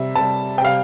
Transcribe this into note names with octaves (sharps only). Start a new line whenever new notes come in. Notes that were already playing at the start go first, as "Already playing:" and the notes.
Already playing: C3 G3 E5
C3 G3 A5
C3 G3 F5 G5